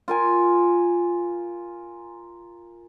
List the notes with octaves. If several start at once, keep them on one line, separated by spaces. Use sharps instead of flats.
F4 A#4 G#5